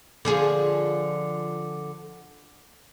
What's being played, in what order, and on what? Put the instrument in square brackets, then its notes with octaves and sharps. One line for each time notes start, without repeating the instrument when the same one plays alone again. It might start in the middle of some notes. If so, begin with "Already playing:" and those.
[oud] D3 F3 G#4